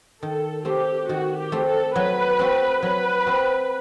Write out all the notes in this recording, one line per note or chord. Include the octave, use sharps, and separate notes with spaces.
D#3 A4
A3 C4 G4
D#3 F#4
G4
A3 C4
A4
F#3 B4
C4 F#4
F#3 B4
C4 F#4